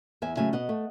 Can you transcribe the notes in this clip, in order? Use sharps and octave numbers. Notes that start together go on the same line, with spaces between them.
E2 E5 G#5
C#3 F#3 A3 E5 G#5
B2 D#5 F#5
A3